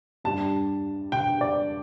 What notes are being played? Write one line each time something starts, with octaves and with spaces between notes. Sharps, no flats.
G2 G3 D4 A5
G5
D5